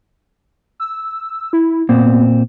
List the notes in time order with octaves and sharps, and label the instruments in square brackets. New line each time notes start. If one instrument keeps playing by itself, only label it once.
[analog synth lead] E6
E4
[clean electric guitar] A#2 C4 [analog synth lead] B3